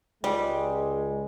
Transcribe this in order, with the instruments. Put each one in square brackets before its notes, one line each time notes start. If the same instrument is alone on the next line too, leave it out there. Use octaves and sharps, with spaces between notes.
[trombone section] C#2 G#3 [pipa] G3